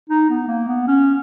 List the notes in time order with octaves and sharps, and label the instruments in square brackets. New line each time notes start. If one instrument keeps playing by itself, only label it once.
[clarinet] D#4
B3
A#3
B3
C#4